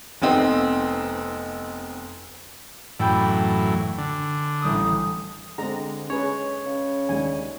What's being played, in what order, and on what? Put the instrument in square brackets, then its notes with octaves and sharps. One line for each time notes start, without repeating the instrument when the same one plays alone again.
[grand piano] F1 B3 C4 D#4 C6
[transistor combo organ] F#2 A2 E3 [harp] D5 G5 B5
[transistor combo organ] D3
[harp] A1 G3 D#6
[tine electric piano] D3 [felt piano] G#3 [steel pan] C4 A#5
[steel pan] C#4 G#4 B4 [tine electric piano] C#5
[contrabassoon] C#3
[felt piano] D#2 [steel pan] G#3 D4 G#5